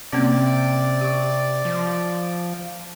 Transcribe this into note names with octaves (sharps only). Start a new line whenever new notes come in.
C3 A#3 C4 C#4 D5
G4 C#6
F3